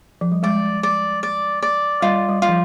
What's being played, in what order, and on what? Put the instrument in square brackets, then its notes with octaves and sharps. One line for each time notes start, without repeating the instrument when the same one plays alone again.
[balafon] F3
G3
[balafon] G#3 [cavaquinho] D5
[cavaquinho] D5
D5
D5
[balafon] G3 [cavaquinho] F4
[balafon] G3
[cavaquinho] F4
[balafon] F3